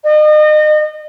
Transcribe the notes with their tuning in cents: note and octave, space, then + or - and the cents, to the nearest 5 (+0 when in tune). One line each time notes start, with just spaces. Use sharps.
D#5 -35